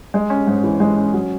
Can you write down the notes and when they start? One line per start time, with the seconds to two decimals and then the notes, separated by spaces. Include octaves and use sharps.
0.14 G#3
0.30 C#4
0.47 G#2
0.64 E3
0.80 G#3
0.97 C#4
1.13 F#3